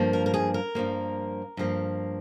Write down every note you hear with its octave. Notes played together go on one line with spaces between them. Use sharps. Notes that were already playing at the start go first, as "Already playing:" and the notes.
Already playing: G2 F3 A#3
A#4
A#4
G#4
A#4
G2 F3 A#3
G2 F3 A#3